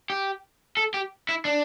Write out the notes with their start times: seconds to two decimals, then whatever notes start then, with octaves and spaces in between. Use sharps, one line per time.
0.10 G4
0.77 A4
0.94 G4
1.29 E4
1.45 D4